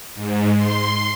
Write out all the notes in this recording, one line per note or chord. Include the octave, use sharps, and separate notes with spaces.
G#2
C6